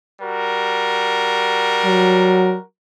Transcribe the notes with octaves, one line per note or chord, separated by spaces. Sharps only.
G3 F#4 A#4
F#3